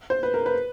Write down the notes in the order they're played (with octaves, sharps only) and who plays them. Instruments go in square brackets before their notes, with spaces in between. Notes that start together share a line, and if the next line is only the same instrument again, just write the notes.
[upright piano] C5
B4
A#4
B4